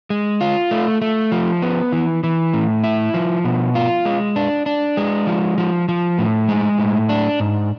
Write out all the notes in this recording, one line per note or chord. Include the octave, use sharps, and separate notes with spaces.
G#3
F4
A3
A3
F3
B3
E3
E3
A2
E4
F3
B2
F4
G#3
D4
D4
G#3
F3
F3
F3
A2
G#3
A2
D4
G#2